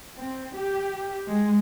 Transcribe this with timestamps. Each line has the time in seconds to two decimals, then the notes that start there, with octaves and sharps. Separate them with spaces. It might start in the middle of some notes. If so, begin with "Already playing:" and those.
0.19 C4
0.57 G4
1.27 G#3